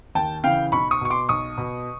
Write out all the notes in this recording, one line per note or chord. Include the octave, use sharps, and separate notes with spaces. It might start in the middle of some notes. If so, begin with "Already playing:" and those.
D#2 G5 A5
C#3 E3 F5 G5
B1 B5 C#6
C#6 D#6
B2 C#6
C6 D6
B1 C#6 D#6
B2